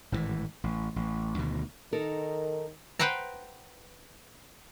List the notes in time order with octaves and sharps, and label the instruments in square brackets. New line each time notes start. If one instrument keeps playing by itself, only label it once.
[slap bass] G#1 A2 C3 E3
A1
A1
D2 B2 D#3
[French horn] D#3 [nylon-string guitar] D#4 A4 A#4
[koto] B4 C5 F#5 G5 A#5